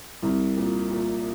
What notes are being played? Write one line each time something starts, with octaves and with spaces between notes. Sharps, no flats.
C2
A#2
A#2